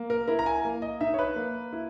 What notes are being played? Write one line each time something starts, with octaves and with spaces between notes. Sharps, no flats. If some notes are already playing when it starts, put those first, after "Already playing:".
Already playing: A#3
A#4
E4 A#4
A#5
G#5
A#3
D#5
D#4 E5
C#5
B4
A#3
E4